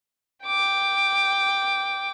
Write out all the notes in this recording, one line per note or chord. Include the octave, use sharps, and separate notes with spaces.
G5 D6